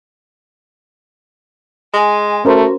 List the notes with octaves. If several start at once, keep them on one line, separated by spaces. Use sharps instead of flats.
G#3 G#5
A3 C#4 F#4 A#4 C5